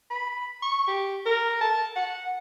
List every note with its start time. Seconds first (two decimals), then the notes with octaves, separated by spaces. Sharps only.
0.10 B5
0.62 C#6
0.88 G4
1.26 A#4
1.61 A5
1.96 F#5